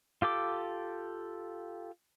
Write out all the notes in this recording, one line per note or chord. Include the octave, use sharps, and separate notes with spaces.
F4 G4 A4 D6